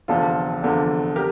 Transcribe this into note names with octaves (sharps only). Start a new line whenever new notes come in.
F1 E2 D3 F3 F4 A4
F1 E2 D3 F3
G4 A#4